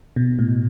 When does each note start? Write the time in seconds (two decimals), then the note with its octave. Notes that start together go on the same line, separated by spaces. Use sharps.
0.16 B2
0.39 A2